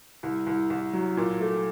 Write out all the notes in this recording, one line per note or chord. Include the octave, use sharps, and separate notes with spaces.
C2
C2
C2
F#3
A#2
A3